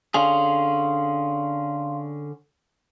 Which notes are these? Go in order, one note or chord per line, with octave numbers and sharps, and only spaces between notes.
D3 C#4 G#4 F5 C6